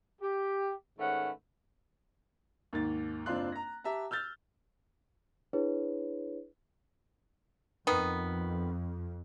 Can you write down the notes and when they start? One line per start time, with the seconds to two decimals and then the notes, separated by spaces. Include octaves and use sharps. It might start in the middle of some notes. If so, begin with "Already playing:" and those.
0.21 G4
0.99 G#2 D#3 A3 C#4 B4 F#5
2.73 D#2 G#2 A6
3.26 F#1 C4 D4 F4 C6 F#6
3.52 A#5 A#6
3.84 G4 E5 A5 A#5
4.11 E6 F6 G6 A6
5.53 D4 E4 G#4 B4 C#5
7.87 F2 D#3 B3